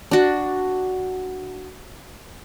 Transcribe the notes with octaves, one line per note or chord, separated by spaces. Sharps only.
D4 F#4